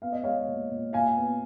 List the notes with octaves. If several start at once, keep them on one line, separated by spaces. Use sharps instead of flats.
B3 F5
D#5
G#3 C#5 F5
A#2
A#2
A#2 F5 G#5
B3